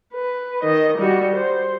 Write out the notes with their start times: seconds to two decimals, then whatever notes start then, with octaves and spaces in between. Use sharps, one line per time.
0.14 B4
0.63 D#3 D#5
0.98 G3 F#4
1.36 C5